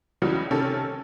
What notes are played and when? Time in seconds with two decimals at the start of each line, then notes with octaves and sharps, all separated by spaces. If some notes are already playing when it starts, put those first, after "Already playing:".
0.22 C#2 C#3 E3 F#3 G3
0.51 C3 D#3 C#4 A4